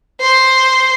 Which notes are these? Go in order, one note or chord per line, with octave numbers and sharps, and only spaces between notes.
C5